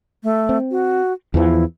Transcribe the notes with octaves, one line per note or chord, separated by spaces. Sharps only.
A3
C4
F#4
E2 E3 F3 E4